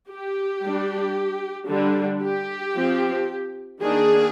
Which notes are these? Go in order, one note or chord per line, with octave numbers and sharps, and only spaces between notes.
G4
G3 D4
D3 G3 D4
G4
F3 C4
D#3 A#3 D4 G#4